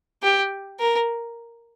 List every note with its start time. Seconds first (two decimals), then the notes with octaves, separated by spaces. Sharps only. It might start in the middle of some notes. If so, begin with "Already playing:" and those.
0.23 G4
0.80 A#4